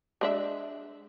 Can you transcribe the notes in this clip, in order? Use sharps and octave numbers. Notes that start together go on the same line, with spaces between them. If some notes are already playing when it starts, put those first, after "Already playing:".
G#3 D4 E5